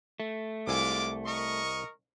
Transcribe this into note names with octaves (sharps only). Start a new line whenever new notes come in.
A3
C2 G#3 F4 E5 G#5 D6
A#4 D#5 C#6